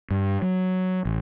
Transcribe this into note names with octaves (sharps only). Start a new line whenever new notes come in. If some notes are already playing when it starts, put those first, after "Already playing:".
G2
F#3
A1